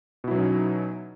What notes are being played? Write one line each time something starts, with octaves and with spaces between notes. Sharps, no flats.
B2 F#3 C#4 D#4 E4